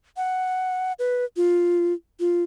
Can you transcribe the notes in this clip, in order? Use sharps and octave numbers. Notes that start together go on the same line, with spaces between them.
F#5
B4
F4
F4